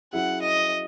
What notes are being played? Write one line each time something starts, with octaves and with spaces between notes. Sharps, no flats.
F#3 C#4 E4 G#4 F#5
D#5